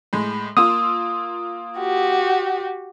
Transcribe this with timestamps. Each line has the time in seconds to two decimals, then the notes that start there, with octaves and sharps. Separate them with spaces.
0.13 A2 G#3
0.57 A#3 F4 D#6 E6
1.78 F#4 G4